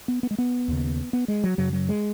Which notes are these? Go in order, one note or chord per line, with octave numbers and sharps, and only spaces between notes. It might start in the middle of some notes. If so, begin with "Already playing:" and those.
B3
B3
G#3
B3
D#2 C#3
B3
G#3
F#3
F#2 C#3 F#3
F#3
G#3